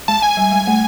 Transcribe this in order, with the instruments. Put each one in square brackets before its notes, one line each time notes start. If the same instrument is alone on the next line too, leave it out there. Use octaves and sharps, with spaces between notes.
[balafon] G#3 [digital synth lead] A5
[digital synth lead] G#5
[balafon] G3
G#3
A3